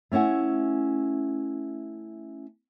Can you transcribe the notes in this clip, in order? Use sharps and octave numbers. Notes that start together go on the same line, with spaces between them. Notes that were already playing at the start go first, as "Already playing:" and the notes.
A3 C#4 E4 F#5 G#5